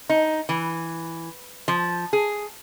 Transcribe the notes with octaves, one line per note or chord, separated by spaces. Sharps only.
D#4
E3
F3
G#4